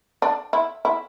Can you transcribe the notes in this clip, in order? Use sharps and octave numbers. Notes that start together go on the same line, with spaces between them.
D4
E4
E4